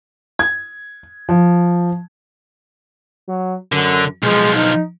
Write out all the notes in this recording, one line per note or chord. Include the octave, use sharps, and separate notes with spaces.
G#6
F3
F#3
F#2 D3
B1 F3 G#3
D#4